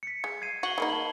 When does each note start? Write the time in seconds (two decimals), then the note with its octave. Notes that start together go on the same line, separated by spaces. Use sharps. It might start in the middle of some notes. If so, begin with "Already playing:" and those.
0.03 B6 C#7
0.24 G#3
0.42 G#6 C7 D#7
0.63 F#4 C#6 F#7 G7
0.78 G#3 A#3 D#4 B5
0.90 A5 F#7